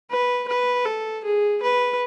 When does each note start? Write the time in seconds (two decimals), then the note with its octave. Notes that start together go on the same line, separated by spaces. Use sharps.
0.10 B4
0.48 B4
0.85 A4
1.24 G#4
1.62 B4